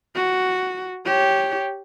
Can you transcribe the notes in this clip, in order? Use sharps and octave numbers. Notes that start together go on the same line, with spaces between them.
F#4
G4 C#5